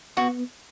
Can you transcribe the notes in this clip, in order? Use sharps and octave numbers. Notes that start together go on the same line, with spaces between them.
B3 F#4